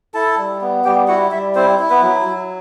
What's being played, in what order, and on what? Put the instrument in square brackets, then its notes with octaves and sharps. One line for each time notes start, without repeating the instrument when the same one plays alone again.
[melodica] E4 A4 A5
G3
B3
G3 G4 G5
E4 F#4 F#5
G3 E4 E5
C4 E4 C5
E4
B3 B4
F#3
F#3